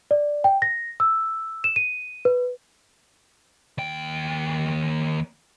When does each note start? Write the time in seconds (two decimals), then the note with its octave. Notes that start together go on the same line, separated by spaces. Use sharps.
0.11 D5
0.44 G5
0.62 A#6
1.00 E6
1.64 E7
1.76 D#7
2.25 B4
3.78 D#2 G5